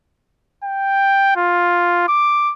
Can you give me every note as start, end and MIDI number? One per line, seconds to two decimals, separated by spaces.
0.64 1.35 79
1.36 2.06 65
2.08 2.53 86